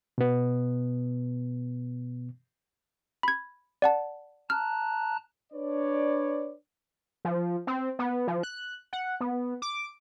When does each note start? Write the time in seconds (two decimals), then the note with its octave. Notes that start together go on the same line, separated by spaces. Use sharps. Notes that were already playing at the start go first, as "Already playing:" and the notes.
0.18 B2 B3
3.23 B5 G#6
3.82 D5 F#5 A5
4.50 A5 A#5 F6 F#6
5.53 D4 B4 C#5 D5
7.25 F3
7.67 C4
7.99 B3
8.27 F3
8.43 F#6
8.93 F#5
9.20 B3
9.62 D6